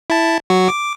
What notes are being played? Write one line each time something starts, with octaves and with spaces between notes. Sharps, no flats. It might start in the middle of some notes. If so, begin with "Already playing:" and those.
E4 A5
F#3 F#4
D6